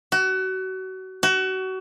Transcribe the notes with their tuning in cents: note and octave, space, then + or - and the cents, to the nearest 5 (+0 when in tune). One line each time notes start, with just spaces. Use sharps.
F#4 +30
F#4 +30